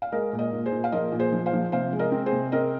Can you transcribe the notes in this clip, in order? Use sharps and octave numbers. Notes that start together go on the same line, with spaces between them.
F5
G#3 A#4 D#5
A#2
A#4 D#5
A#2
G#4 C5
A#2
F5
F3 A#4 D#5
A#2
G#4 C5
F3
C5 F5
F3
C3 C5 F5
G#3
A#4 D#5
C4
G#4 C5
C3
C4 A#4 D#5